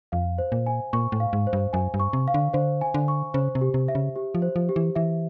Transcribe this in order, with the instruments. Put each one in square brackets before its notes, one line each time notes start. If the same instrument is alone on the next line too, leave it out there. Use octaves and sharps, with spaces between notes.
[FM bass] F2 [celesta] F5
[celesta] C5
[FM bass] A#2
[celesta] G#5
[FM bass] A#2 [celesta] C#6
[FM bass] A2
[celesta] F5
[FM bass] G#2
[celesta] C5
[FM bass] G2
[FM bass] F#2 [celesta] G#5
[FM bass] G2
[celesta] C#6
[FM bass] C3
[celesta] F5
[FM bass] D3
[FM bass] D3 [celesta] C5
[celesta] G#5
[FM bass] D3
[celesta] C#6
[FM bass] C#3 [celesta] C5
[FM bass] C3
[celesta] G4
[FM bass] C3
[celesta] E5
[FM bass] C#3
[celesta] G4
[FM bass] F3
[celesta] C5
[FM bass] F3
[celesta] G4
[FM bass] E3
[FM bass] E3 [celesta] E5